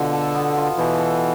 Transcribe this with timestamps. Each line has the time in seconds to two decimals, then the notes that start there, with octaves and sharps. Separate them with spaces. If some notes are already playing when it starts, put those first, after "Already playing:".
Already playing: B2 D3 B3 F4
0.13 A4
0.34 B3
0.57 F4
0.78 B2 E3
0.99 A4